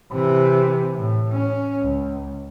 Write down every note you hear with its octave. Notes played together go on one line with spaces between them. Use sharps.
C3 E3
A2
C#4
C#2